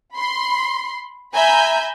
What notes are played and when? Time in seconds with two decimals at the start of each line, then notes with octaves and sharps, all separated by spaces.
0.14 B5 C6
1.33 E5 G#5 A#5 B5 G6